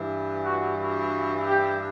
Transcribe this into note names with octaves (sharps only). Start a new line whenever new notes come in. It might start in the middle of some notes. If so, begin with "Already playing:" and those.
Already playing: G2 E3
F#4
F#4
G4